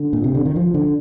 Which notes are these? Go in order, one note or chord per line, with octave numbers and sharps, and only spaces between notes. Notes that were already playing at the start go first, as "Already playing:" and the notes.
Already playing: D3
A#2
C3
D3
D#3
F3
D3